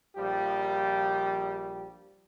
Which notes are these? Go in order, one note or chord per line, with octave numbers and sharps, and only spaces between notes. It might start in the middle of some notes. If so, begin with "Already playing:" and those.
A#1 F3 G3 G4